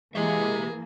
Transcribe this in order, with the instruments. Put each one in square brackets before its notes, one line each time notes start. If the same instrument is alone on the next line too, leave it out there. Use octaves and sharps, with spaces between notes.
[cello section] E3 A#3 [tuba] G#3 [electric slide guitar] G4 E5 [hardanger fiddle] G#4